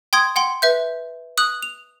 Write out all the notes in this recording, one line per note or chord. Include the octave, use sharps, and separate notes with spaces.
G5 C6 D#6 G#6
F#5 G5 C6
B4 E5 G6
D#6 F#6 F#7
F7